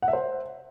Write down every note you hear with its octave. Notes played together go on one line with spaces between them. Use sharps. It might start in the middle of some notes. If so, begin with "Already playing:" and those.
F#5
E5
C5